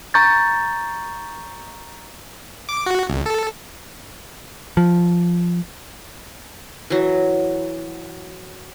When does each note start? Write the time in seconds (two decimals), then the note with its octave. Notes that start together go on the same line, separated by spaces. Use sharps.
0.14 A#5 C#6 G6 A6
2.69 D6
2.86 F#4
3.09 C#2
3.26 A4
4.77 F3
6.90 E3 F#3